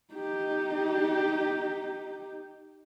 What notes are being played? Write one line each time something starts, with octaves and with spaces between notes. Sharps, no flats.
D#4 G4